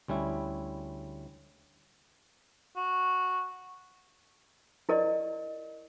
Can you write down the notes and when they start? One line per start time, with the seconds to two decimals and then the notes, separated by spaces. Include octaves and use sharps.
0.08 D2 G3 C#4 E4
2.76 F#4
4.89 E4 A#4 D5 D#5